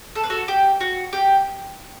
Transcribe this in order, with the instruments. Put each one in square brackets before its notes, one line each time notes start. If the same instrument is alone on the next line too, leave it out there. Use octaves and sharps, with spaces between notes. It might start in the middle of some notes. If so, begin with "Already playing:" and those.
[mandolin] A4
B4
F#4 A4
G4
F#4
G4